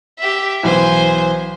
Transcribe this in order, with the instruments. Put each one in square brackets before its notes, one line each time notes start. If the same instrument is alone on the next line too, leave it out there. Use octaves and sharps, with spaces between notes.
[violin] G4 E5
[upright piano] B1 E3 [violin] C5 G#5